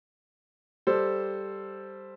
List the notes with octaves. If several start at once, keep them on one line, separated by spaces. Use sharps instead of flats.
G3 A4 C5